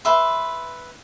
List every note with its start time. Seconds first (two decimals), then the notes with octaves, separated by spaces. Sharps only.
0.05 B4 E5 C6